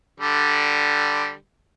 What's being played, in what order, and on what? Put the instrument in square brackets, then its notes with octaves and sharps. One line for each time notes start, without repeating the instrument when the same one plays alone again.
[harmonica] D3 G3